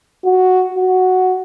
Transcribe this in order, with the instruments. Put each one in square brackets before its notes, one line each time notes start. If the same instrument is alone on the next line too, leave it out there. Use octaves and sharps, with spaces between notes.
[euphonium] F#4
F#4